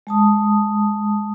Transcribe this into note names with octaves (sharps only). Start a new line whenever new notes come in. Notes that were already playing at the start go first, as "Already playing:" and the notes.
G#3 A5 D#6